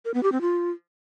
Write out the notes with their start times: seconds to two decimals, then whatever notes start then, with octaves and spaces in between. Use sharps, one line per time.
0.05 A#4
0.14 B3
0.23 G4
0.32 C4
0.41 F4